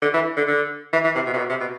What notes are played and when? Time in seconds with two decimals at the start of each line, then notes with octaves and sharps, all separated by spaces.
0.02 D3
0.14 E3
0.37 D3
0.48 D3
0.93 E3
1.04 E3
1.15 C3
1.26 B2
1.34 C3
1.38 B2
1.50 C3
1.60 B2